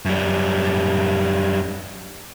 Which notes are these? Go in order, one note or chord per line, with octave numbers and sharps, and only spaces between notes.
F#2 G3